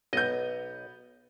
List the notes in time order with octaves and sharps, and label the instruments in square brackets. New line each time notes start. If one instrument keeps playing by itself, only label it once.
[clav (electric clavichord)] B1 D#5 [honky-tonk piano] B3 G6